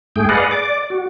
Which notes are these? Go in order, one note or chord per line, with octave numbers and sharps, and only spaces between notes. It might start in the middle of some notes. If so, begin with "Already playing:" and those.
G#2 A3 G#4 G5
G#4 B4 D5 D#5 F5 F#5
D5 D6
F#4